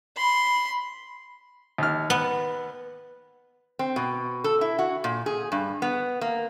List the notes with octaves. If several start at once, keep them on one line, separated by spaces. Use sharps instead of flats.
B5 C6
D#2 F6
B3
C4
B2
A4
E4
F#4
A#2
G#4
G2
B3
A#3